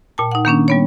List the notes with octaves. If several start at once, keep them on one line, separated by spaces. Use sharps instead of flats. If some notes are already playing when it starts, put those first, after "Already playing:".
A#2 G5 A5
D#4 F#5
D#3 A#3 C#4 D4
G3 B3 C#5